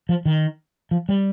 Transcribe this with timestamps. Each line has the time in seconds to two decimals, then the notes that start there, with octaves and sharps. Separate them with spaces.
0.09 F3
0.25 D#3
0.91 F3
1.09 G3